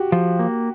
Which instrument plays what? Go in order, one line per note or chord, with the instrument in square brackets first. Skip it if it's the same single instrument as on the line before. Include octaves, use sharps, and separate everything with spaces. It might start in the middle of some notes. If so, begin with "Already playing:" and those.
Already playing: [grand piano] F#4 G4
[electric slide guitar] F3
A#3